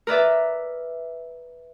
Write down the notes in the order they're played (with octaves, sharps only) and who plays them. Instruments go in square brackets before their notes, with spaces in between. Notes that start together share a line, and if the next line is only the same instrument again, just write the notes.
[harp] A#4 B4 D5 E5